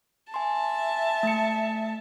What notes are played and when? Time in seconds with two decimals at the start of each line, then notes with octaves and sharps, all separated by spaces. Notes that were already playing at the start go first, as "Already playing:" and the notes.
0.34 E5 G#5 A5 C6
1.23 A3 C#7